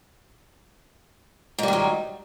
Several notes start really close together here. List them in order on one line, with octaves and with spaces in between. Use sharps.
G#2 G3 D#3 F#3